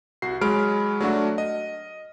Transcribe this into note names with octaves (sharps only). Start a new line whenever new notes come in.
C2 F#4 C7
F#3 G#3 B5 F6 D7
F#3 A3 D4 F#4
D#5